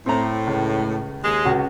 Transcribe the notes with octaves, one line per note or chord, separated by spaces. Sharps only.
A2 C4 A#5
C#2
D#2 G#3
C#2 F#4